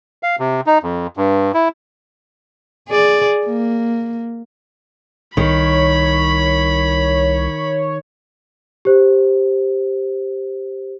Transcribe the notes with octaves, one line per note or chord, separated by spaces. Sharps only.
F5
C3
D#4
F2
G2
E4
G#4 D5
A#3
C2 D#3 C#5 B5
G4 C5